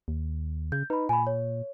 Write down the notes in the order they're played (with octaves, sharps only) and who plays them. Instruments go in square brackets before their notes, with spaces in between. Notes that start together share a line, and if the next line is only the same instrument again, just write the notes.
[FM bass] D#2
[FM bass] C#3 [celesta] G6
[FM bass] D#4 [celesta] B4 B5
[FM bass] A#2 [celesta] G#5 B5
[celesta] C#5